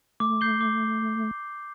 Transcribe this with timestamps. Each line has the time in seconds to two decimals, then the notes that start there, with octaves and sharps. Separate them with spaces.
0.20 A3 D6
0.41 G6 C7 G7
0.61 D6